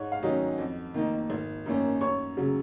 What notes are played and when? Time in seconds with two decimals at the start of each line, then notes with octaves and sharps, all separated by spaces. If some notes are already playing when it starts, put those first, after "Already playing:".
Already playing: G#2 C#5
0.12 F5
0.23 D#3 F#3 C#4 D#4 D#5
0.58 F2
0.94 D#3 A#3 D#4
1.30 G#1
1.66 F#2 D#3 A#3 C#4
2.01 F#2 C#5 C#6
2.37 C#3 F#3